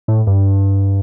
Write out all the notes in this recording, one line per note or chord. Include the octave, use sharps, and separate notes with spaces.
A2
G2